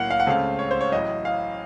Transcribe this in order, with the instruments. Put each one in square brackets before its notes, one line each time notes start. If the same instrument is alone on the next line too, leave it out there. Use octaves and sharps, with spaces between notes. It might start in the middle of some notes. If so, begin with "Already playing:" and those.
Already playing: [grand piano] A2 F#3 A#3 F5 F#5
F5
F#5
C#2 C#3 A3 C4 F5
C#5
C5
C#5
A1 A2 F#3 D#5
F5